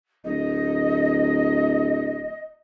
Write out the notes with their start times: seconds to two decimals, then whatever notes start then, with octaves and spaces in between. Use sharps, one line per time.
0.24 D1 D#5